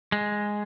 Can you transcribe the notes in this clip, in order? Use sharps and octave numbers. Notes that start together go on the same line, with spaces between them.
G#3